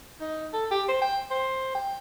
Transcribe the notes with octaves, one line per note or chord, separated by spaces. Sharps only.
D#4
A4
G4
C5
G5
C5
G5